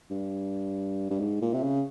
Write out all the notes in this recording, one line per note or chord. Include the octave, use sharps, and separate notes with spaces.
G2
G2
G#2
A#2
C3
C#3